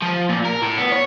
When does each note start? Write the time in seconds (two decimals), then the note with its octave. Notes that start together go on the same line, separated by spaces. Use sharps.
0.02 F3
0.29 A#2
0.45 A#4
0.62 A2
0.78 B3
0.92 C#5